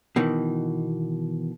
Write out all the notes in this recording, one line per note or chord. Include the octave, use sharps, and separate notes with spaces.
B2 D#3 E3